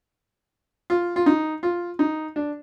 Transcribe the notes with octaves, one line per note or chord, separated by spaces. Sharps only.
F4
F4
D#4
F4
D#4
D4